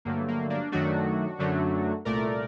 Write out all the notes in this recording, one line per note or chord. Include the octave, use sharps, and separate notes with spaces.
G2 D3 F#3 A3 A#3
A#3
A#3 D4
F#2 D#3 F#3 A3 D4 F#4
F#2 D3 F#3 A3
C2 A#2 A3 A#4 D5